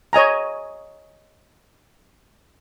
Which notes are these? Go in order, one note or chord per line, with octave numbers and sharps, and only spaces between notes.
C#5 D#5 G#5 A#5